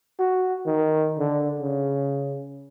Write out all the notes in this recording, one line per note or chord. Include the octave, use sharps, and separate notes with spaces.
F#4
D#3
D3
C#3